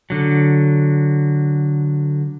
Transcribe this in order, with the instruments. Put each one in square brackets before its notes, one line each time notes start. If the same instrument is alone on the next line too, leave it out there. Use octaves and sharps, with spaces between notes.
[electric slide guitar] D3 F#3